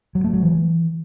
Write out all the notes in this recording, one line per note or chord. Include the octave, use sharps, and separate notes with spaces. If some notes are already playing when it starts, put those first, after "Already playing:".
F#3
A3
F#3
E3